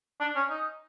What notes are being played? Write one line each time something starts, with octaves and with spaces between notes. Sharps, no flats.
D4
C#4
D#4